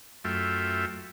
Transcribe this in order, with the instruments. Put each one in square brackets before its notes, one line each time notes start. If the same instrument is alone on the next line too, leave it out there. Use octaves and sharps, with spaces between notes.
[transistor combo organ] F#2 A3 F4 E5 G5